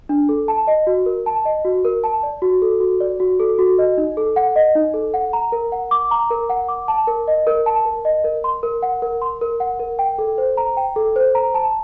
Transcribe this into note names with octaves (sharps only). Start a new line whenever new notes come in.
D4
A4
A5
D#5
F#4
A#4
A5
D#5
F#4
A#4
A5
D5
F#4
A4
F#4
D5
F#4
A4
F#4
D#5
D#4
A4
F#5
D#5
D#4
A4
F#5
A#5
A#4
F#5
D6
A#5
A#4
F#5
D6
A5
A#4
D#5
A#4
A5
A#4
D#5
A#4
C6
A#4
F#5
A#4
C6
A#4
F#5
A#4
G5
A4
C5
A#5
G5
A4
C5
A#5
A5